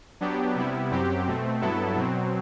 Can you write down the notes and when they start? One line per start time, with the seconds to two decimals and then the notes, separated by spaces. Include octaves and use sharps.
0.21 F#3 B3 D4 G4
0.56 C3 G3 B3 E4
0.91 F#2 F#3 C4 G4
1.27 B2 A3 C4
1.61 G2 F#3 B3 E4 A4
1.96 B2 F#3 C4